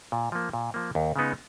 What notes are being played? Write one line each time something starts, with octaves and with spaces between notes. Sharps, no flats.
A#2
F3 A#3
A#2
F3 A#3
D#2
C#3 G#3 B3 D#4